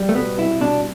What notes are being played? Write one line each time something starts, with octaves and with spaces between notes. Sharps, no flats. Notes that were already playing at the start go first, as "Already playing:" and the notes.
Already playing: G3
A3
B2 B3
C2 E4
B2 D4